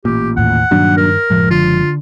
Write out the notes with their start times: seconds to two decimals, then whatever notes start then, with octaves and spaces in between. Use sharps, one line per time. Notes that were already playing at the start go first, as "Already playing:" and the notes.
0.05 A1 A#2 G4
0.37 D#2 A2 F#5
0.71 G2 A#2 D#3 F#3 D4
0.97 A#4
1.30 F#1 A2 F3 G#3
1.51 D3 F4